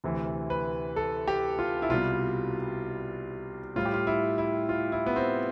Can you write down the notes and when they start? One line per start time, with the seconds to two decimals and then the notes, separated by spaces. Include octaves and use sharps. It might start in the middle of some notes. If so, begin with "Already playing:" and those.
0.04 D2 C3 E3
0.50 B4
0.96 A4
1.28 G4
1.59 F4
1.82 E4
1.90 C2 B2 G3 F4
3.76 A2 G3 F4
3.85 G4
3.94 F4
4.07 E4
4.38 E4
4.69 F4
4.92 E4
5.06 B3
5.16 C4